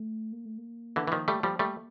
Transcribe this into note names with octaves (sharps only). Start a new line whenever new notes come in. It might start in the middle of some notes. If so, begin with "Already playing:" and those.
Already playing: A3
A#3
A3
A#3
D3 E3
E3
D#3 F3
G3 A3
F3 G3
G3 A3